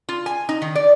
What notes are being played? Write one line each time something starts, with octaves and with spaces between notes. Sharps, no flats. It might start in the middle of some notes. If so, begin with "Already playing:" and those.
F4
G#5
D#4
D#3
D5